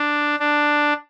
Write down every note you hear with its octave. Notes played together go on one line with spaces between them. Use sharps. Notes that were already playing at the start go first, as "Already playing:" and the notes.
Already playing: D4
D4